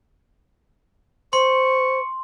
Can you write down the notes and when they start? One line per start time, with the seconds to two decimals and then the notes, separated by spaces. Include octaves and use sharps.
1.33 C5 C6 C#6